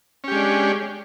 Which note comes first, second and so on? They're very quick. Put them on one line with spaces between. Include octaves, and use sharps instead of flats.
C#4 G4 G#3 D4